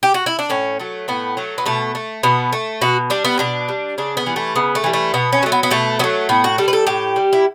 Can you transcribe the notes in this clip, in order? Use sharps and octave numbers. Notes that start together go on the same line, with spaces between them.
G4
F#4
E4
D4
A2 C#4
F#3 A3
A2 B3
F#3 A3
B3
B2 A3
A3
B2 B3
A3
B2 F#4
G3 D4
B3
B2 D4
G3
C#3 D4
B3
E3 G3
A3
C#3 B3
A3
E3 G3
A3
B2 B3
C#4
F#3 A3
B3
B3
B2 A3
F#3 A3 B3
A2 B3
F#4
G3 A4
B4
A4
A2 G4
G3
E4